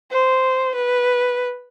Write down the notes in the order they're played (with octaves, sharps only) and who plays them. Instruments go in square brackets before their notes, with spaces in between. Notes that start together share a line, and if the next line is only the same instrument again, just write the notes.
[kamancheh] C5
B4